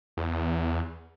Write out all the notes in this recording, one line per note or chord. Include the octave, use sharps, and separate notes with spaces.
E2